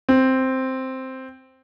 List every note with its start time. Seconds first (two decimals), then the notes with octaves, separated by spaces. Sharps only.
0.09 C4